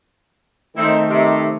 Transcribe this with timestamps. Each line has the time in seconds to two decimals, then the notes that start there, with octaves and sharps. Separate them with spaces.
0.76 D#3 A3 C4 D#4 E4
1.09 C3